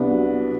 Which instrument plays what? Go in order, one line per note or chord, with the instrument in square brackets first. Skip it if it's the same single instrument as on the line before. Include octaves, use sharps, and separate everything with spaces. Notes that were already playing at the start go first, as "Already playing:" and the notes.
Already playing: [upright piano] C2 B3 D4
F#3